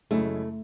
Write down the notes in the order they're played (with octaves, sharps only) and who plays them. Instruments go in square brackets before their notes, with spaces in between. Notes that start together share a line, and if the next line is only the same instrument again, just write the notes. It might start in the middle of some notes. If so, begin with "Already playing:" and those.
[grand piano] F#2 C#3 G#3 C#4 E4 [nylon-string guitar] A3